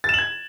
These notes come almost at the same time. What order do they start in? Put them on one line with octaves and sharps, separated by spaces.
A6 E7 F#7 G#6